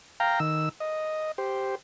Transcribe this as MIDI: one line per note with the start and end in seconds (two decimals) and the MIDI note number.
0.20 0.40 77
0.20 0.40 79
0.20 0.40 82
0.40 0.69 51
0.40 0.69 88
0.80 1.32 75
1.38 1.75 67
1.38 1.75 72